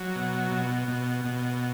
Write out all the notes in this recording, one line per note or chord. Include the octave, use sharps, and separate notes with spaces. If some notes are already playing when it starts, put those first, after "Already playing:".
Already playing: F#3
B2
B2
B2
B2